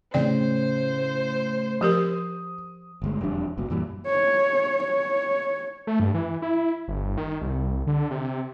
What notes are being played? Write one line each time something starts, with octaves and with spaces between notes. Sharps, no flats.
A2 C#3 C5 D5 G5
F3 G4 A#4 D#6
G1 D2 G#3
E1 F2 G3 D4
F#1 C#2 B2
F#2 A#2 E3 G3
C#5
C#5
A3
G2
E3
E4
G1
D#3
C2
D3
C3